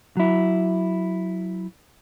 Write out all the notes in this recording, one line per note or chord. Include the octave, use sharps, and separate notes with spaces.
F#3 E4